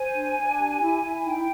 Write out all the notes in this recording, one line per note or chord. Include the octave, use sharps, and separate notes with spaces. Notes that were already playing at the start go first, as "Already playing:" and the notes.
Already playing: C5 G#5
D4
D4
G4
E4
E4
D#4 G5